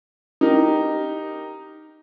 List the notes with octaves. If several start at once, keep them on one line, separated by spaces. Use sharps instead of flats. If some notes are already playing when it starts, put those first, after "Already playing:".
D#4 G4 A#4